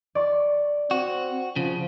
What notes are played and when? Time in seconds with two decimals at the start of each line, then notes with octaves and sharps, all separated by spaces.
0.15 D5 C#6
0.91 C4 F#4
1.56 C#3 F3